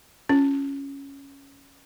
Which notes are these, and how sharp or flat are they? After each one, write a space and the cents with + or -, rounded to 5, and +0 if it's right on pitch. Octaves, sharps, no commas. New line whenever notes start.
C#4 +0 F4 -5